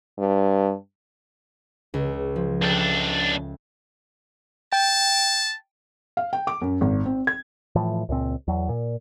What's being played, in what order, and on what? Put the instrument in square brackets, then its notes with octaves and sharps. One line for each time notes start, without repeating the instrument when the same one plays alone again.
[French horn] G2
[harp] C#2
F3
[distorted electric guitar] C#2 D4 [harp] A4 E5 G5
[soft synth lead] G5 [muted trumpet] A5
[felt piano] F5
G5
D6
F#2
G#1
C4
G#6
[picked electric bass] A2 E3 F3
C#2 A#2 C4
E2 F#3
A#2